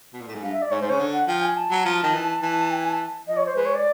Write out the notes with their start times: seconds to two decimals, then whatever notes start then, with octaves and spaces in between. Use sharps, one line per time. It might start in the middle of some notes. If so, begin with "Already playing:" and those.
0.13 B2
0.21 A#2
0.28 A2
0.35 G#2
0.43 G2 F5
0.52 E5
0.62 D5
0.71 G#2 C#5
0.81 G#2 C5
0.90 C#3 C#5
0.99 D3
1.13 F#5
1.28 F3 G5
1.42 G#5
1.57 A5
1.71 F#3
1.85 F3
2.03 D#3
2.14 E3
2.42 E3
2.71 G5
2.80 G#5
2.89 A5
3.27 F3 D#5
3.37 C#5
3.46 C5
3.56 G#3 B4
3.65 C#5
3.75 D5